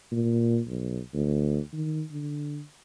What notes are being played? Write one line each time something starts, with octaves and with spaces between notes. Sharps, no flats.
A#2
B1
D2
D#3
D3